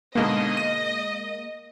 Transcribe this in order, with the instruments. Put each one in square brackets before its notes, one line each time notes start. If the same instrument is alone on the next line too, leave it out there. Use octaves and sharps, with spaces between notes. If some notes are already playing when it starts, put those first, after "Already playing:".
[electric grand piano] G#2 B2 D3 [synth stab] G#3 A#3 [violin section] D#5
[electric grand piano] A#6 D#7